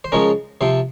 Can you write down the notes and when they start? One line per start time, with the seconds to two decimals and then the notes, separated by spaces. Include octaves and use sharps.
0.04 C5
0.12 C#3 F3 G#3 C#4 A#4
0.61 C3 F3 C4 C5